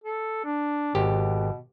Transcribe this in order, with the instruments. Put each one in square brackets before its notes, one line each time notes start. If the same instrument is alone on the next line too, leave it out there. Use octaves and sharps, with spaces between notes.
[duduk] A4
D4
[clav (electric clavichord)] G#1 G4 [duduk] B2